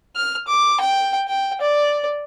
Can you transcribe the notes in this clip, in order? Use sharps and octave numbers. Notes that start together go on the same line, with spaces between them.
F6
D6
G5
G5
D5